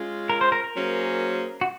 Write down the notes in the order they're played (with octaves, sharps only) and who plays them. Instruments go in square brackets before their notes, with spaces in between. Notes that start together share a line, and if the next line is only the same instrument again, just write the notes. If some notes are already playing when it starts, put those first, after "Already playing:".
Already playing: [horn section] G#3 C#4 F4
[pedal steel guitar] A#4
C5
A#4
A#4
[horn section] F#3 A#3 C#4 G#4 C5
[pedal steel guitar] F#4